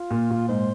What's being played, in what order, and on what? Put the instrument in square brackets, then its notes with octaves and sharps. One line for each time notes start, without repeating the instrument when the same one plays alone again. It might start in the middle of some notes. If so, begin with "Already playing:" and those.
Already playing: [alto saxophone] F4
[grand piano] A#2
A#2
[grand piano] G#2 [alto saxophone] C5